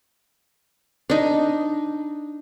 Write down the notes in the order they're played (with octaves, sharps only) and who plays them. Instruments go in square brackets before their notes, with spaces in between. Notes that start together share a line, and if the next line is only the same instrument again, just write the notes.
[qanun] D4 D#4